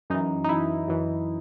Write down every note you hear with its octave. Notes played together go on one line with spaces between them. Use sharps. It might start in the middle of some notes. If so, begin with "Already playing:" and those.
F#2 E3 D#4
D#4
F#2 E3 E4
F#2 E3